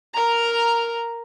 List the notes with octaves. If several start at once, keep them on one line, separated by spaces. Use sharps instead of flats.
A#4 A#5